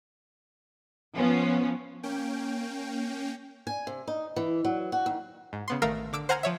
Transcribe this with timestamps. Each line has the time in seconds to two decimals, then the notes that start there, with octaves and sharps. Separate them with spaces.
1.15 F3 B3 C#4
2.03 A#3 C#4 G5
3.67 G#5
3.87 C3
4.07 D#4
4.36 E3
4.65 F#3
4.92 F#4
5.06 D#2
5.53 G#2
5.68 C#3 B3 C6
5.82 A1 D#3 A3 A#4 F5 E6
6.13 D3 D6 E6 D7
6.29 C5 F#5 G#5 A#5 F6 G#6
6.43 F3 C#5 E5